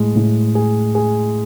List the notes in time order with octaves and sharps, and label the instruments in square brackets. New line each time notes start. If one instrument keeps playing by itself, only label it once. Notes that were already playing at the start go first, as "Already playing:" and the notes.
Already playing: [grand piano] A2 G#3
A2
G#4
G#4